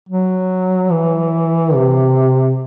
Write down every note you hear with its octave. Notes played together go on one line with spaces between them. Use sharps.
F#3
E3
C3